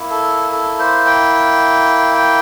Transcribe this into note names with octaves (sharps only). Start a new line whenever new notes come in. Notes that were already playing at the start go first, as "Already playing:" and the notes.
Already playing: A#3 E4
A4
A4
C5
G5
G5